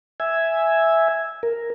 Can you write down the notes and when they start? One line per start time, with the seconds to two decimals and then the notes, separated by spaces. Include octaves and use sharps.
0.20 E5 G#5
1.43 A#4